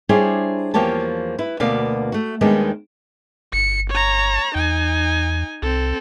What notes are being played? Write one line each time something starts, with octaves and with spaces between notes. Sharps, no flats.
G3 D4 E4 G#4 C5 C#5
E2 F3 A#3 G4 C#5 A5
E4 B4
D2 B2 A#3 B3 D5 F5
A3 F#4
D#2 D#3 G3 G#3 B3 D4
G1 C#7
C#5 A#5
E2 D#4 G#5
C2 C4 A4